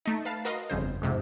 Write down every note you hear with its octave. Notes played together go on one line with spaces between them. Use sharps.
A3 D#4
B4 F5 A5
F#4 A#4 B4 D#5 F5 C6
G1 F2 C#3 C5
F2 G#2 C3